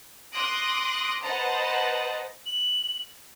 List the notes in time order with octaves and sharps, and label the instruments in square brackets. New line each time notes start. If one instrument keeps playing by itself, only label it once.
[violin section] C6 D6 D#6 F#6 A#6 D7
B4 C5 D#5 F#5 A5 A#5
[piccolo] F#7